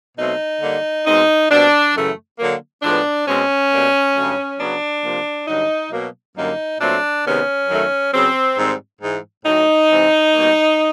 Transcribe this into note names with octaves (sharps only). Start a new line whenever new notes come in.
B2 F#3 A3 C4 D#4
D3 G3 A#3
B2 G#3 C4 D#4
B2 G3 C4 D4
F#2 C#3 E3 A3
D3 F#3 A#3
A2 F3 G#3 B3 D4
B2 G#3 C4 C#4
B2 G3 A#3
G2 D3 F#3 A3
C#3 F#3 B3 D4
C3 F3 A#3
G2 D3 F#3 D#4
B2 F#3 A#3
F#2 D3 G3 A#3 D#4
A#2 F#3 A3 C4 D4
C3 D#3 G#3 B3 C#4
F#2 D#3 F#3 A3
C#3 F#3 B3 C4
G#2 D#3 G3 C4
G#2 E3 G#3
A2 F#3 A3 D#4
C3 E3 G#3 C4
B2 G3 A#3